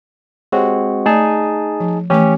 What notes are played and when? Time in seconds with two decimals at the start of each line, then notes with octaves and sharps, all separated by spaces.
0.52 G#3 C4 F#4 G4 C#5
1.06 A3 D#4 G#4 D5 A5
1.80 F3
2.10 E3 A3 C#4 G4 C#6